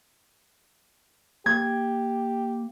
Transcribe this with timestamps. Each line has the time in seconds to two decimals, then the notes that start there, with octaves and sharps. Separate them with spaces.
1.46 A#3 G4 G#6